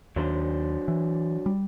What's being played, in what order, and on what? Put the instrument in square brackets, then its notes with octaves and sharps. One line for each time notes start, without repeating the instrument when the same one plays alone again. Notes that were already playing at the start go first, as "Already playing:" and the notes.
[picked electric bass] D#2 [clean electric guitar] F#3 D4 C5
[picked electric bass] E3
G3